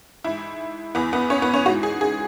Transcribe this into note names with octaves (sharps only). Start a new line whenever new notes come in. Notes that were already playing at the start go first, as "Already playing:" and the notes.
G#2 E3 E4
E2 E3 B3
B3
C#4
B3
C#4
G#2 E3 F#4
G#4
G#4